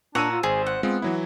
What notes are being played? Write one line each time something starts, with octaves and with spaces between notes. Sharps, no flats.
A#2 D4 C#5 F#5 A#5 E6 D#7
F4
G#1 G#4 C5
F#5
G#3 B3 C4 F4
E3 F#3 E4